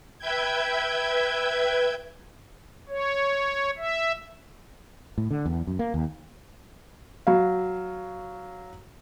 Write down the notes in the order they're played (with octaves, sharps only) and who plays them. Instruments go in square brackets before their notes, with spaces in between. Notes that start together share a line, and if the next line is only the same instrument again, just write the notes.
[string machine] B4 E5 G5 G6 G#6
[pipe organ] C#5
E5
[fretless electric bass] A2
D3
E2
F#2
A#3
D#2
[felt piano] F#3 F5